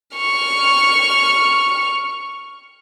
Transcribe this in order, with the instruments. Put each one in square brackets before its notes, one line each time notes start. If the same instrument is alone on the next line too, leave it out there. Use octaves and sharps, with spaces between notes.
[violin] C#6 F6